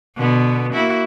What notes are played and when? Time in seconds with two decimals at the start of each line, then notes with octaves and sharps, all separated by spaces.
0.16 B2 D3 B3
0.73 A#3 E4 F#4